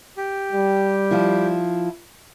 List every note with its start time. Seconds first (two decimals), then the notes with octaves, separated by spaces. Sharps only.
0.17 G4
0.52 G3
1.11 F3 E4